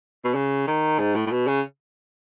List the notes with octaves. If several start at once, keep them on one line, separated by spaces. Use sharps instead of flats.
B2
C#3
D#3
G#2
A2
A2
B2
C#3